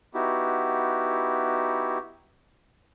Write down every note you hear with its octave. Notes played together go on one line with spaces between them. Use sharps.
B3 D#4 E4 F#4 G4